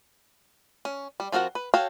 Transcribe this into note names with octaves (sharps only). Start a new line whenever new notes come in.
C#4
G3
F3 C4 F#4 A#4 F#5
B4
F#4 A4 C#5 F5 G5